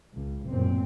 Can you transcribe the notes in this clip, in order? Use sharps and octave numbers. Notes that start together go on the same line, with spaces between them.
C#2
A1 F#2 A#2 C4